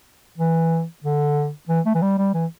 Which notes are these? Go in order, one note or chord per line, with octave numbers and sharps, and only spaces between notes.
E3
D3
E3
A3
E3
G3
G3
E3